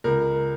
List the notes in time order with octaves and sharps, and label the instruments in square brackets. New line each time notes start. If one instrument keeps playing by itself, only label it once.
[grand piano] C#2 A#4